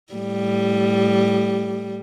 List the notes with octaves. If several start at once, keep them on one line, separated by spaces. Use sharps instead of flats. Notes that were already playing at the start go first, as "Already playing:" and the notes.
A2 G3